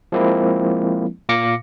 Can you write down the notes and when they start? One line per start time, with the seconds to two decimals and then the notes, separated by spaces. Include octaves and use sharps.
0.12 F3 G#3 A#3 C4 E4
1.29 A#2 F5 D6 A#6 C#7